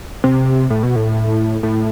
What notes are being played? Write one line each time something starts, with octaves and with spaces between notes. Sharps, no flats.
C3
A2
B2
A2
A2